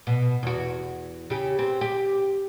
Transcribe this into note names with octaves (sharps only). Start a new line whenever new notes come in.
B2
E2 F#4
C#3 G4
C4
G4